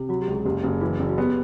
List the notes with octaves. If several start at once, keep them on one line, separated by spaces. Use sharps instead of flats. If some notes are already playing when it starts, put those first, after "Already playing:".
Already playing: C3
F#3 F#4
G4
C#2
G#4
F#1 G4
F#1
E3 F#4
F#1
F#4
B3 G4